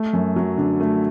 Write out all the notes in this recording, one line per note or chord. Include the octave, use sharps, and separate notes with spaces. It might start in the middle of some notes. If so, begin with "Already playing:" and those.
Already playing: A3
F#2
F#3
D3
A3